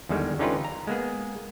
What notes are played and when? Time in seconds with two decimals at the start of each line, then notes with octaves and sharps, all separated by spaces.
0.09 E2 D3 D#3 G3 G#3
0.39 D3 C#4 D#4 F4 G4 B4
0.64 A#5
0.87 G#3 A#3 B3 G#4